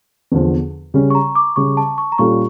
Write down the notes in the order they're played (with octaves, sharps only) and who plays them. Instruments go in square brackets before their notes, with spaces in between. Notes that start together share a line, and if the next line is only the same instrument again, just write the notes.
[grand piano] E2 D3 F3
C#3 G3 C#4
[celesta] C#6
A#5
D6
[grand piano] C#3 G3 C#4 [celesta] C#6
[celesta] A5
C#6
A#5
[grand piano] A#2 G3 C#4 F4 A4 [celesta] C#6